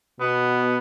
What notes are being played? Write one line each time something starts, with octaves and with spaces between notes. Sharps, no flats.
B2 B3